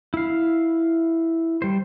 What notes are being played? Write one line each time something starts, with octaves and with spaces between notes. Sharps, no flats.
E4 F5
G3 C5